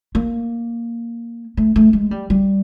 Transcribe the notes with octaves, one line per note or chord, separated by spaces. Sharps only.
A#3
A3
A3
G#3
G3
G3